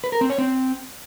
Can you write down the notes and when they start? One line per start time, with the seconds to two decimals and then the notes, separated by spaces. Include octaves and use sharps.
0.04 B4
0.12 A#4
0.21 C4
0.30 C#5
0.38 C4